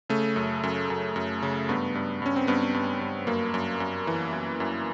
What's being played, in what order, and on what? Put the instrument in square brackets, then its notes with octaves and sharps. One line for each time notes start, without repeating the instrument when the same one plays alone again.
[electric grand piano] C#3 A3
F#2
F#2
F#2
F#2
C#3
G2 B3
G2
G2 C#4
C4
G2 B3
G2
G2
F#2 A#3
F#2
F#2
E3
F#2
F#2